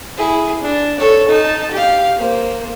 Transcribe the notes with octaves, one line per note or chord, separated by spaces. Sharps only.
E4 G#4
D4
A4 C#5
D#4 A5
G4 F5
A#3 C5